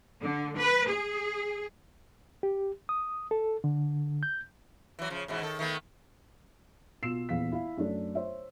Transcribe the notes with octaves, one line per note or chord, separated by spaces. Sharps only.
D3
B4
G#4
G4
D#6
A4
D3
G6
E3 F#3
C#3 F3
G#2 B2 E3
D#3 A4
D#3 A3 B3
B2 F4 E6 C7 E7
D#1 E2 E3 B3 F5 B6
E4 F5
F#2 A3 D4
C5 C#5 E5